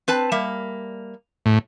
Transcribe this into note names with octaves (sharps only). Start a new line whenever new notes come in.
C4 B4 A5
G3 A#3 E5
A2